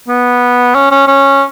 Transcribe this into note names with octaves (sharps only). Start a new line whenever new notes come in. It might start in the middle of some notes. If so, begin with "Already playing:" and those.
B3
C#4
C#4
C#4